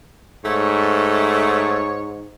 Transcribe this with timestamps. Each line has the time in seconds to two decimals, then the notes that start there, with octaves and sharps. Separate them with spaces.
0.45 G#2 A3 C#5